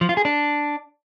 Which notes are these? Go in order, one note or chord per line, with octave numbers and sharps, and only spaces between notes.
F3
F4
G#4
D4